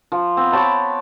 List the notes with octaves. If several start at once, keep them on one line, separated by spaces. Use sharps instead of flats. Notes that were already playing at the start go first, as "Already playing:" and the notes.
F3
B3 C4
C#5 G5 A5 B5